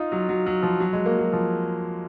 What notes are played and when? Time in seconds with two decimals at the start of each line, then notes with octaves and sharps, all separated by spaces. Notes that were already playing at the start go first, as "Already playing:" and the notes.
Already playing: D#4 F4
0.12 F#3
0.29 F#3
0.46 F#3
0.63 F3
0.80 F#3
0.93 G#3
1.06 A#3
1.19 F#3
1.33 F3